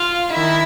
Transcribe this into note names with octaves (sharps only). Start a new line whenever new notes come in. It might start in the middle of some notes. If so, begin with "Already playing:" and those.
Already playing: F4 F5
D#3 E4 E5